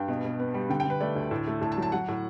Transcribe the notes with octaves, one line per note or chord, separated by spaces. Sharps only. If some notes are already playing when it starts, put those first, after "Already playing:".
Already playing: G2 G5
B2
B2
B3
G3
D3 G5
G5
D3 B4
A3 D5
D2
A2
A3
A2 A5
A5
F#3
A5
F#3 F#5
A2